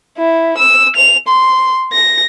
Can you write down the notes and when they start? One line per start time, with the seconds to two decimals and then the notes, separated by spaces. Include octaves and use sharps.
0.18 E4
0.57 E6
0.96 F7
1.28 C6
1.92 A#6